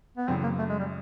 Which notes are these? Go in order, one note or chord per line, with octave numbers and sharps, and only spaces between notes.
B3
F#2 C#3 E3 C4
A#3
A3
G#3
G3